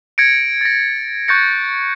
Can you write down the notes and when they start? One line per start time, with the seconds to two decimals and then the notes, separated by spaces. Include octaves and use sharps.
0.18 G#6 A#6 C#7 D7
0.61 A6 A#6
1.28 C#6 F#6 G6 A6 A#6 C#7